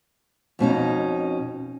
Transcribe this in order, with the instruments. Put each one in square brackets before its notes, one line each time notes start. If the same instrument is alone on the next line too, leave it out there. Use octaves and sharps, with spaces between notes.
[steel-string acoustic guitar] F2 B2 C#4 D#4